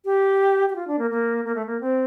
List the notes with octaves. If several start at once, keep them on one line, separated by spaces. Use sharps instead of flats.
G4
G4
F4
D4
A#3
A#3
A#3
A3
A#3
C4